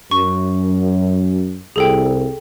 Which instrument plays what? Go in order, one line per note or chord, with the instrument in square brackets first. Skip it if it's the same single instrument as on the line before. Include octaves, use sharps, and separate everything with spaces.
[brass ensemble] F#2 [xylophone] C#6
[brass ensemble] C2 [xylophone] G#4 A4 G5